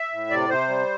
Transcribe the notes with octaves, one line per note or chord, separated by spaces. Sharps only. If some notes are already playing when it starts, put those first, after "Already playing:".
Already playing: E5
A2
C3 D5
C3 C5
G3